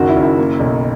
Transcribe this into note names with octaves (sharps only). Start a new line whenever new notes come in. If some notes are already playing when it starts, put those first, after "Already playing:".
Already playing: F#1 D#3 F#4
E4
F#1
E4
A#3
B1